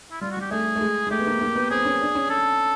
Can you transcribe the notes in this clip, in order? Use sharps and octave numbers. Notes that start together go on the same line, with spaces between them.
E4
G3 F4
F#4
G3 G4
A3 G#4
A3
G#3
G#3
A3 G4
B3
A#3
A#3
B3
C4 G#4
C#4
D4
C#4
A4